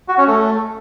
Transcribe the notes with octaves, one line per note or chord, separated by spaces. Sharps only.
F#4
C#4
A3